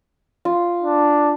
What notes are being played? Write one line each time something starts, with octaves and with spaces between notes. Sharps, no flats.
F4
D4